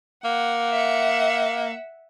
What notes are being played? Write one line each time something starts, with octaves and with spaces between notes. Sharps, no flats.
A#3 F#5
E5 F#5